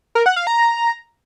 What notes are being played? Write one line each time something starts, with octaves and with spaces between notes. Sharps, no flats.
A#4
F#5
F5
A#5